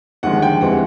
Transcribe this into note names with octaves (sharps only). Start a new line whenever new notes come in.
D#2 D3 F3 G#3 F#5
G5
E2 C3 E3 G#3 F#5